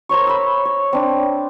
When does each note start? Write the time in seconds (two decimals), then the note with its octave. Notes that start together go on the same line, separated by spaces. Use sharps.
0.09 A#4 C5 C#5 C#6
0.27 B5 E6
0.65 C#5
0.93 C4 D4